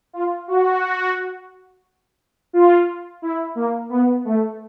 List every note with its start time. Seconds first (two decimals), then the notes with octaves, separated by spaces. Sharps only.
0.13 F4
0.48 F#4
2.53 F4
3.22 E4
3.55 A#3
3.90 B3
4.25 A3